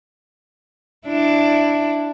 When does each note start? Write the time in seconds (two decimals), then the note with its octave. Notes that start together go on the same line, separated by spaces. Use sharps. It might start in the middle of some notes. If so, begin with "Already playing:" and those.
1.06 D4 E4